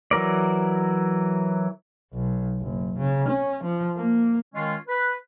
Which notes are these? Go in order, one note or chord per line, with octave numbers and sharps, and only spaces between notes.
E3 F#3 A#4 D5
B1
F#1
C#3
C#4
F3
A#3
D#3 G#3 C#4 F4
B4